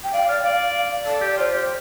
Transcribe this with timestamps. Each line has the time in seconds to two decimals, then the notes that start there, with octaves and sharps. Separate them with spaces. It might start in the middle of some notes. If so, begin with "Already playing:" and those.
0.04 G5
0.12 D5 F5
0.28 D5 F5
0.43 D5 F5
1.06 A4 D5
1.21 G4
1.37 F4 D5
1.41 C5
1.53 G4